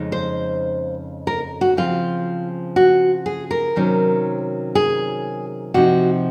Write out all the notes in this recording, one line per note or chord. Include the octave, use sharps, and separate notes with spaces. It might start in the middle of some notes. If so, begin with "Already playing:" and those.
Already playing: F2 C#3 G#3 D#4
C5
A#4
F#4
C#3 F3 C4 F4
F#4
G#4
A#4
C3 D#3 F#3 C#4
G#4
C3 F3 C4 D#4 F#4